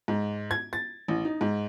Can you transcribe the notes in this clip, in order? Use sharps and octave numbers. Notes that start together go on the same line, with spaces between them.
G#2
G#6
A6
A1
D#4
G#2